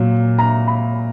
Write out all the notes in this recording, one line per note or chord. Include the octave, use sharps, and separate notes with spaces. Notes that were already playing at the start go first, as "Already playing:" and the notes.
Already playing: A#2 F#3
A#5
B5